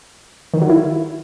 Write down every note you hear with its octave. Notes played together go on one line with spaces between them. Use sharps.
D#3
F#3
E4